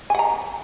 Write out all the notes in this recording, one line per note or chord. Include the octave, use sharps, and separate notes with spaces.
F#5 G#5 A#5